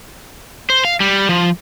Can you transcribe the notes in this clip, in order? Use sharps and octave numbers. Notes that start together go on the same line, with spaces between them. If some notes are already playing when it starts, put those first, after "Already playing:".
C5
F5
G3
F3